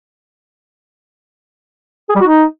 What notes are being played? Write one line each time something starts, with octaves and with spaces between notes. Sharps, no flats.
G#4
G3
F#4
D#4